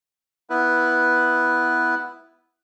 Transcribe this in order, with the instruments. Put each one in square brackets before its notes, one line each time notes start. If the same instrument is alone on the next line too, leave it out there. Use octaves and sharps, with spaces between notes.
[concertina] B3 E4 B4